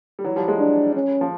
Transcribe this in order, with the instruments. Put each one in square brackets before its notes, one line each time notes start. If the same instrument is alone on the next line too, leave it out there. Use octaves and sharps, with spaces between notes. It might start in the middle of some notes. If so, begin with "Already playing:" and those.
[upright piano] G3
E3 F#3
F3 G3
F#3 G#3
[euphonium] D4
C#4
[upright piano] F3